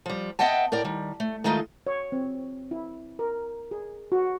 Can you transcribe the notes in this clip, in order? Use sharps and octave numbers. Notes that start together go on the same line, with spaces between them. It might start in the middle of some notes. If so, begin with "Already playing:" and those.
F3 G3
B3 D#5 E5 F#5 G5 A5
A2 A#4 D5 G5
D#3 G3
A3
D#3 G#3 A3 D#4 F4
C#5
C4
E4
A#4
G#4
F#4